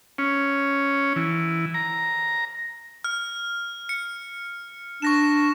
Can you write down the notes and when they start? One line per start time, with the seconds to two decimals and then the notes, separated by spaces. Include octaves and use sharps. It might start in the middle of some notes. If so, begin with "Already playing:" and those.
0.18 C#4
1.16 E3
1.74 A#5
3.04 F6
3.89 C#7
5.02 D4 C#6 A#6 E7